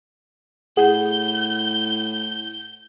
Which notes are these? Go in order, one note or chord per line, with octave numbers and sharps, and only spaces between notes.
A2 G#4 F#5 G6